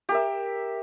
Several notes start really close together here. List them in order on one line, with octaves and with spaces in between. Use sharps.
G4 A#4 E5